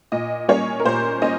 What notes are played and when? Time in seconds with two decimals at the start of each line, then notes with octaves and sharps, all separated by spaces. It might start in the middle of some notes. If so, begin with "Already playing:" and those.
0.12 A#2 D#5
0.48 G3 A#3 C#4 C#5
0.80 A#4
0.85 A#2 C5
1.22 A#3 C#4 D#5